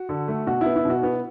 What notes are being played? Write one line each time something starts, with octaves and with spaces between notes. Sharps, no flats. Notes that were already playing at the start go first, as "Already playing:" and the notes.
Already playing: F#4
D3
A3
B2 F#4
E4
B3
E4
B2 F#4
B3